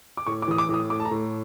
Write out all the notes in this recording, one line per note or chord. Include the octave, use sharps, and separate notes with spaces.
D6
A2 C#6
D6
E3 D#6
D6
A2 D#6
A3 D6
A5
A#5
A2